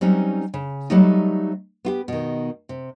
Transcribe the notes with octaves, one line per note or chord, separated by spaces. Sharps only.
F#3 G3 C4 C#4 D#4
C#3
F#3 G3 A3 D#4
B3 F4 G4
B2 D#3
C3